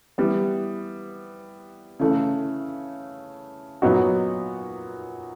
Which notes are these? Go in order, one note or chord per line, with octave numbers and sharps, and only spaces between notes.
E3 G3 B3
C#3 E3 A3
A#2 F#3 B3 D#4 F#4